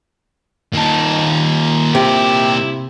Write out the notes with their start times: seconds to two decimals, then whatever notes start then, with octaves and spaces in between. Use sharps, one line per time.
0.74 D#2 A#2 D#4 A5
1.95 C3 E4 G4